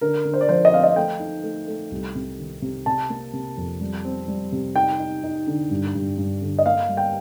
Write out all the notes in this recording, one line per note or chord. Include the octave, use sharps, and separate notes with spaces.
D3 A#4
D3
C5
D5
F3 C5
D#5
C4 F5
D#5
A3 G5
D#4
A3
A3
C2
C3
D#3
C3
C3 A5
A#3
C3
F2
G3
C4
G3
C3
D#4 G5
D#4
D#4
D3
G2
G2
G2
D3
D#5
A#3 F5
G3
G5